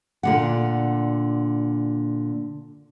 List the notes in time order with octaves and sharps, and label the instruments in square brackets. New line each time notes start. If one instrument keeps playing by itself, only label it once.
[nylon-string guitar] A#2 D3 F#5